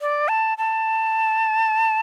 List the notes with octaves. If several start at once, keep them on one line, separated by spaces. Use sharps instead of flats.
D5
A5
A5